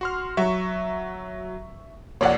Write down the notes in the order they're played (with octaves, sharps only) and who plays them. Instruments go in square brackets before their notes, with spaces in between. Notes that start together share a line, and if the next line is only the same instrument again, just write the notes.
[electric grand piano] F#4 C6 F6
[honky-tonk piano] F#3 [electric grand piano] E5 C#6
[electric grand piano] F2 C3 A#3 [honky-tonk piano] C#5 D5 F#5